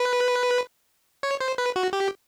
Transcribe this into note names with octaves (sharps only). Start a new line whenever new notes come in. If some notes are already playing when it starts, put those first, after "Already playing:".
Already playing: B4
C#5
C5
B4
F#4
G4